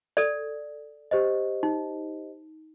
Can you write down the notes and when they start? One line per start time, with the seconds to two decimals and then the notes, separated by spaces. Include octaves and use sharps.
0.17 A4 D5
1.11 G4 C5 D#5
1.63 D#4